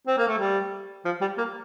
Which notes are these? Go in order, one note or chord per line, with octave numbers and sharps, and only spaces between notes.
C4
A#3
A3
G3
F3
G3
A#3